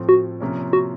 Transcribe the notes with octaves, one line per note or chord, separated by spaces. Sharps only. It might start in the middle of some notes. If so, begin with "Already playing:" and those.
Already playing: A2 F3 A3 C4
F#4
C3 F3 A#3 C#4
F#4